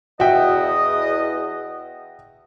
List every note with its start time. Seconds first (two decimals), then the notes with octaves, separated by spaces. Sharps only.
0.20 E2 F#4 D#5 E5 G5